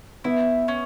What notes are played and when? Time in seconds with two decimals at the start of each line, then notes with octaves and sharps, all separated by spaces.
0.24 B3 E4
0.68 C#4